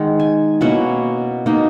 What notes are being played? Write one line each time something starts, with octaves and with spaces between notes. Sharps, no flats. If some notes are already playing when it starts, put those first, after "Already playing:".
Already playing: D#3 G#3 D#4 F#5
G#5
B2 A#3 C#4 E4 F#5
B2 A#3 D#4